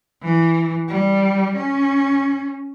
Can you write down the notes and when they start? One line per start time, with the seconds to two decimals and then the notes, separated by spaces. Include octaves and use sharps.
0.21 E3
0.88 G3
1.56 C#4